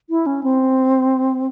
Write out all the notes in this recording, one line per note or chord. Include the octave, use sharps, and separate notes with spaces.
E4
C#4
C4